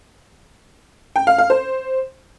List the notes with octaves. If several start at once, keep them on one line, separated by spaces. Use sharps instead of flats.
G5
F5
F5
C5